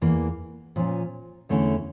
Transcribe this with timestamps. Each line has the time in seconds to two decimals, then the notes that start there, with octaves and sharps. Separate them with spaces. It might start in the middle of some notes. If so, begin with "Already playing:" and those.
0.02 E2 E3 A#3
0.76 A#2 F3 C#4
1.49 E2 D3 A3 C#4 E4